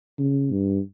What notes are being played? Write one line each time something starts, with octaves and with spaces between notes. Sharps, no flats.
C#3
G2